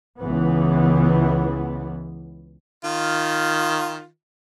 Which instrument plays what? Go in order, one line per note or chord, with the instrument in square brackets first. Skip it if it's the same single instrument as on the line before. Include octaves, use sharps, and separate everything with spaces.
[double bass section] C#2 E3 B3
[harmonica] D#3 F4